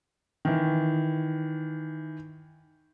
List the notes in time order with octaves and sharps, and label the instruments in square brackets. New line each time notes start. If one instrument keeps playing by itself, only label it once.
[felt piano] D#3 E3